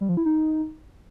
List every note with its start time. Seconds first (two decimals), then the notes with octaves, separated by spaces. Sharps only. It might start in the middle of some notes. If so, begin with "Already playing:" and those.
0.01 G3
0.09 F3
0.17 E4
0.25 D#4